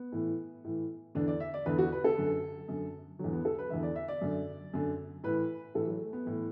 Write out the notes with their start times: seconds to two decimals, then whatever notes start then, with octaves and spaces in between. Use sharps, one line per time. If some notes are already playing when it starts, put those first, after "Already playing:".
Already playing: B3
0.12 A2 E3
0.65 A2 E3
1.15 E2 D3 D4
1.28 D5
1.40 E5
1.54 D5
1.66 E2 D3 B4
1.78 F#4
1.92 B4
2.04 A4
2.18 F#2 D3
2.68 F#2 D3
3.19 D3 F#3
3.24 E2
3.33 B3
3.45 A4
3.59 B4
3.70 E2 D3 E5
3.83 D5
3.96 E5
4.08 D5
4.21 F#2 D3
4.74 F#2 D3
5.24 A2 E3 B4
5.75 A2 E3 A4
5.87 F#3
6.01 A3
6.13 B3
6.26 A2 E3